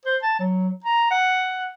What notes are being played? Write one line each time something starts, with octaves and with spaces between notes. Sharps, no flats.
C5
A5
F#3
A#5
F#5